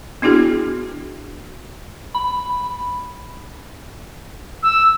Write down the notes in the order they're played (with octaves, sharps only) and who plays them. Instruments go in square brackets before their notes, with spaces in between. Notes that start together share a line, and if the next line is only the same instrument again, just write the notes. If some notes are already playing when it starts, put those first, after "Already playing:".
[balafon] B3 D4 E4 F#4 G#4
[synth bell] B5
[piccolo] E6